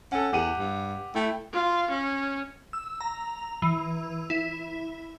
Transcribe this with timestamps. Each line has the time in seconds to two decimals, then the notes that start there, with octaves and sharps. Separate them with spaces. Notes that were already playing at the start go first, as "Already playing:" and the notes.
0.12 C#4 A4 F#5
0.33 E2 G4 F#5 D#7
0.57 G2
1.15 A3 E4 G5
1.53 F4
1.91 C#4
2.73 E6
3.01 A#5
3.62 E3
4.30 E4